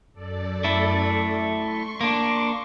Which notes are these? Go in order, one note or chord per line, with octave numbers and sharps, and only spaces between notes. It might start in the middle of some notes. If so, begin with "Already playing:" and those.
F#2 A4 D5
A3 E4
C6 C#6
A#3 D4